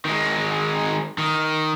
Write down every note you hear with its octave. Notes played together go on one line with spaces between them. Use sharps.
D#3 G#3
D#3